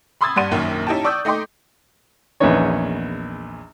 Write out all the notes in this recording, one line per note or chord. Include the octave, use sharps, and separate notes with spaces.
B5 C6 D#6 E6 G#6 A6
G2 G3 F#5 C6 D#7
A#1 F#2 A#2 D#3
C#4 D#4 E4 G4 G5 A5
D5 C#6 D#6 E6 G6
A3 D#4 D#5 G5 C6 D6
A#1 E2 B3 C#4 D#4 C#5